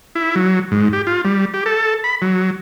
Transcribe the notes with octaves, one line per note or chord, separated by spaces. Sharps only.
E4
F#3
G#2
G4
F4
G3
G4
A4
B5
F#3